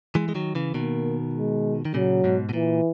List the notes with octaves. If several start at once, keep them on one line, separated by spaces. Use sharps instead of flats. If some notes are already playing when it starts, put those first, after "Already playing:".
E3 G#3
G#3
D#3 F#3
C#3 E3
B2 D#3 A#3
G#3
D#3
A#2 C#3 F#3
G#2 B2
B2
A#2 E3